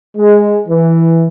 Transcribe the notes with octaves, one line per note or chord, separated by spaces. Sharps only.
G#3
E3